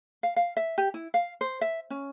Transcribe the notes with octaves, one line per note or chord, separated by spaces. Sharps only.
F5
F5
E5
G4
E4
F5
C5
E5
C#4